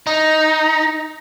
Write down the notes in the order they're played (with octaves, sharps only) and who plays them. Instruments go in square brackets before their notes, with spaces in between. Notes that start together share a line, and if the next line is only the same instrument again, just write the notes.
[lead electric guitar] D#4